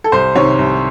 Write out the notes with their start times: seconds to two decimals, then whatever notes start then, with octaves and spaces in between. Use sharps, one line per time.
0.04 A4
0.12 C2 C5
0.35 C3 D#3 C#5
0.59 C2